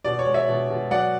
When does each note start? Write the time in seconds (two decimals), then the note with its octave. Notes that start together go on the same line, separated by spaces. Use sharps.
0.05 B2 D5
0.19 C#5
0.26 G#3
0.34 C#5 E5
0.49 B2
0.70 B2
0.91 F#3 D5 F#5